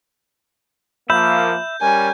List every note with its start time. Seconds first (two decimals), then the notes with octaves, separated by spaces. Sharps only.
1.10 F3 A#3 E5 B5 G6
1.82 G3 C#4 A#4 G#5